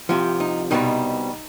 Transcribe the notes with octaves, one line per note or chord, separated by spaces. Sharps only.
C2 C3 F3
D#4
C2 B2 G3 D#4